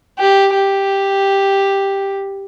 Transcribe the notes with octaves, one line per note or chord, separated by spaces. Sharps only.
G4
G4